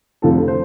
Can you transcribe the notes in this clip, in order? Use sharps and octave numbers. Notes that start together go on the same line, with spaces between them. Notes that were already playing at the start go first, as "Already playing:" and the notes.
F1 F2 D3 F3 A4
A4
C5